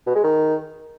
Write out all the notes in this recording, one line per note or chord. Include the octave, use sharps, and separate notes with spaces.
B2
G#3
D#3